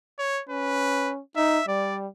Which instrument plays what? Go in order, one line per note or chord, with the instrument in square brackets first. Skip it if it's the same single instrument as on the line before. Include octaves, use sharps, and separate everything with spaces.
[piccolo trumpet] C#5
[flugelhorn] C#4 [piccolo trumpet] B4
[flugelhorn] D#4 [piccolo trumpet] E5
[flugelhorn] G3 [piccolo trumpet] D5